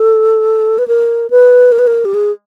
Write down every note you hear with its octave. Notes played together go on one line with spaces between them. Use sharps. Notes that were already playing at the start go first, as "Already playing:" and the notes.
Already playing: A4
B4
A#4
B4
A#4
B4
A#4
G4
G#4